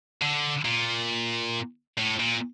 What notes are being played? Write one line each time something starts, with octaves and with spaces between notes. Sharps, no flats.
D3
A#2
A2
A#2